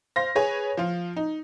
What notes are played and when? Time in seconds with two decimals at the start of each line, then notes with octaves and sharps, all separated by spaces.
0.16 C5 F5 A#6
0.36 G#4 B4 C#5 G#5
0.77 F3 F4
1.16 D#4